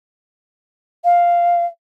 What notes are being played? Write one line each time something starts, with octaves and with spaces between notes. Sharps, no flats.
F5